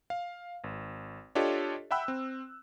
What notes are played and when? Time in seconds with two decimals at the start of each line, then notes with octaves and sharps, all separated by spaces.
0.10 F5
0.64 G#1
1.35 D4 F4 G4 A4 C#5 D#5
1.91 E5 F#5 G5 B5 E6 F#6
2.08 C4